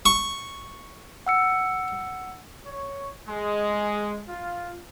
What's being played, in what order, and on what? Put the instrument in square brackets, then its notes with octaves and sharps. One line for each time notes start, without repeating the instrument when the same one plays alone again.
[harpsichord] C#6
[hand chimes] F#5 E6 C#7
[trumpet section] C#5
G#3
F4